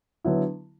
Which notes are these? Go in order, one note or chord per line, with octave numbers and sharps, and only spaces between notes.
D3 F#3 B3 E4